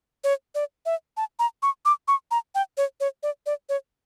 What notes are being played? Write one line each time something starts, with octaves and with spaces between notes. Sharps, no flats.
C#5
D5
E5
A5
A#5
C#6
D6
C#6
A#5
G5
C#5
C#5
D5
D5
C#5